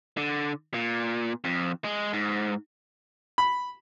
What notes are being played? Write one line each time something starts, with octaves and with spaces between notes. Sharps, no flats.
D3
A#2
F2
G#3
G#2
B5